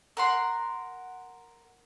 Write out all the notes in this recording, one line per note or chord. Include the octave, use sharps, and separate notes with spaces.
A#4 F#5 C6